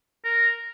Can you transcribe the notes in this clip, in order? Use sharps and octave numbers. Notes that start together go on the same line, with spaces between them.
A#4